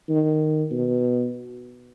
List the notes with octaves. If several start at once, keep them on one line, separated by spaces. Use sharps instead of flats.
D#3
B2